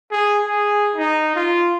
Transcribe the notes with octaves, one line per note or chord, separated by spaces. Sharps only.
G#4
G#4
D#4
F4